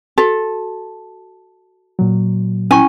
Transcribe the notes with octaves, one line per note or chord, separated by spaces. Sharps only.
F#4 A4
A#2 F#3
C#4 E4 G#5 C#6